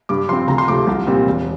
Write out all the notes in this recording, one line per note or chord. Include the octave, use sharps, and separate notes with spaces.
G2 D6
F3 C4 C6
D2 A#5
C6
C3 F3 A3 D6
C2
A#2 G3 C4
E1